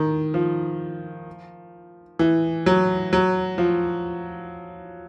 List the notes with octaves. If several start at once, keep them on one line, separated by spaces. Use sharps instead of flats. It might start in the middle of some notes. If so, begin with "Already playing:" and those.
Already playing: D#3
F3
E3
F#3
F#3
F3